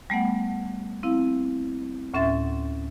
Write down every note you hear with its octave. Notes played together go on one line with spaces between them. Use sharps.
G3 A3 B3 F#5
C4 E4 F5
D2 A2 C#4 E5 C6 A6